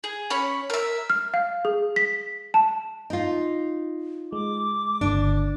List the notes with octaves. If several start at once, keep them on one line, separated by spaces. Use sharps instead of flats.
G#4
C#4 C#5 B5
A#4 E5
F6
F5
G#4
B6
A5
D#4 F4
G#3 D6
G1 C#2 D3 D4